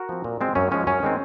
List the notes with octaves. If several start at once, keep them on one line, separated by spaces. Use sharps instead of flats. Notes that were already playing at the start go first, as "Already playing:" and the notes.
Already playing: F#4 A#4
F3 C4
A#2
G#3 C4
F#2 C#4
F3 G#3 C#4
F#2 C#4
D#3 G#3 C4